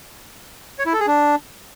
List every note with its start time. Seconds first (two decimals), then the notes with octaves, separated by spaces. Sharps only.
0.79 C#5
0.86 E4
0.93 A4
1.00 G#4
1.07 D4